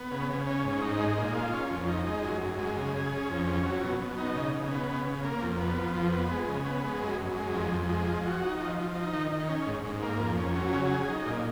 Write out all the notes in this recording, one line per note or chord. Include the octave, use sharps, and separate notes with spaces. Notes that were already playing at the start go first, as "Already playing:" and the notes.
Already playing: B3
C#3
C#3
C#4
G#2
D#4
G#3
A#2
F4
C#4
F2
D#4
G#3
F#2
F#2
G#3
C#3
G#4
C#4
F2
C#4
F#3
B2
B2
D#4
C#3
C#3
B3
C#3
C#3
A#3
F2
B3
F3
F2
B3
G#3
C#3
B3
G#3
F#2
F#2
G#3
F2
F2
G#3
F3
F#4
D#4
F3
F3
D#4
D#3
D#3
C#4
G#2
G#2
A#3
F2
C#4
F#3
C#3
G#4
D#4
A#2